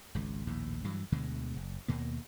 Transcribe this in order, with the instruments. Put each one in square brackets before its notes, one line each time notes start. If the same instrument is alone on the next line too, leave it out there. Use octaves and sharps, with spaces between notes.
[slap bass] G#1 C#2
A#1 D#2 A2
G2 E3 F#3
D2 B2 D3 G#3
F#1
D#2 B2 A#3